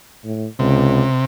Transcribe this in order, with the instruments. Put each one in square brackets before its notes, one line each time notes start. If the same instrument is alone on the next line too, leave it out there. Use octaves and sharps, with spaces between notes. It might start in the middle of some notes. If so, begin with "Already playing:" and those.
[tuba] A2
[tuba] C#2 [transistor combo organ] C3